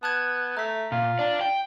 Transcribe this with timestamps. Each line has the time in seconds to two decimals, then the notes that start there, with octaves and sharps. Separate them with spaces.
0.03 B3 A5 F#6 G#6
0.57 A3 A#5 B6
0.92 A#2 F4
1.19 D4 D5
1.41 G5